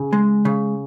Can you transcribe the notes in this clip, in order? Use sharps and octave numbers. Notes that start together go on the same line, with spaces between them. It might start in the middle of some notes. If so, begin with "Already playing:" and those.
Already playing: C#3
G#3
C#3